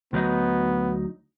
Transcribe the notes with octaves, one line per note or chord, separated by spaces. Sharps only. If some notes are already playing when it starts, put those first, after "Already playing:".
D2 F#3 B3 D#4